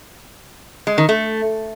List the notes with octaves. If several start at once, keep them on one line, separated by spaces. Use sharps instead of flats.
G#3
D#3
A3